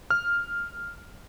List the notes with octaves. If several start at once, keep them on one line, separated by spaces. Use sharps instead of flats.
F6